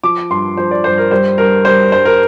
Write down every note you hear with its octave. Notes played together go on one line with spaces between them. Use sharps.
F3 D6
G2 C6
F3 C5
D5
G2 C5
A#4
G3 C5
G2 A#4
G3 C5
G2 C5
A#4